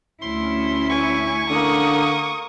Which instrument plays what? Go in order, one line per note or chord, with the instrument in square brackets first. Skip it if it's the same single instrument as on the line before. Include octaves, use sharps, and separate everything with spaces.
[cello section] D2 C#4 E4 [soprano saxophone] C6
[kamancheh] G#5 [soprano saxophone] C#6
[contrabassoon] D3 [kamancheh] A#3 D#6